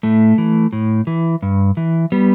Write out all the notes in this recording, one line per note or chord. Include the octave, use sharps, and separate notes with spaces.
A2 A3
E3
A2
E3
G2
E3
G3 B3